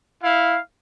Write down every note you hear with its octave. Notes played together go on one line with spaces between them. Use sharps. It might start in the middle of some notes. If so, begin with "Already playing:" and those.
E4 F5